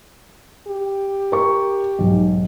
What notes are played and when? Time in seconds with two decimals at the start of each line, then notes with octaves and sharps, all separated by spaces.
0.68 G4
1.32 A#4 C#6
1.99 B1 G#2